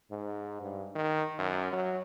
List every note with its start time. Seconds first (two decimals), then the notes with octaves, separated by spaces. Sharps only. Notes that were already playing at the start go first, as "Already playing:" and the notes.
0.11 G#2
0.61 G2
0.95 D#3
1.39 F#2
1.73 F#3